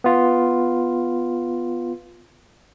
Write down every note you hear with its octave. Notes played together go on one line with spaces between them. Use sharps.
B3 F4